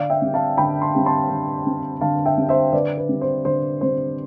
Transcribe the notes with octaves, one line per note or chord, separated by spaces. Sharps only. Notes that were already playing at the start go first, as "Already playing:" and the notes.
Already playing: D3 D5 F5
E5 G5
G3 C4
F5 A5
D3 G5 B5
A5 C6
G3 C4
A5 C6
D3
G3 C4
D3 F5 A5
E5 G5
G3 C4
C5 E5
D3 B4 D5
B4
G3 C4
C5
D3 C5
G3 C4 C5